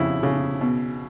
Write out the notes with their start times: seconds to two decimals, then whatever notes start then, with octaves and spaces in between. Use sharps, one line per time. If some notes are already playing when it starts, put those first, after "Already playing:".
Already playing: F2 C#3 E4
0.23 C#3
0.61 B2